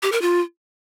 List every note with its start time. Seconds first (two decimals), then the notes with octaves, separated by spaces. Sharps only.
0.03 G4
0.12 A#4
0.22 F4